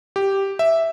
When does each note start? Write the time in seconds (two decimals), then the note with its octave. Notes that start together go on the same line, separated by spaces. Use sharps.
0.16 G4
0.59 E5